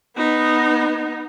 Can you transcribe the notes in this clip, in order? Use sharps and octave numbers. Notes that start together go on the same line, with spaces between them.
B3 D#4